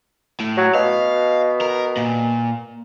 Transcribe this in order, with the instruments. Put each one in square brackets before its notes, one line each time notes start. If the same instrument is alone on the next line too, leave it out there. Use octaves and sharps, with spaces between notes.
[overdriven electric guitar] A2
[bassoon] F#3
[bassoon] B2 [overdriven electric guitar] F5
[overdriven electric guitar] A#4
A#2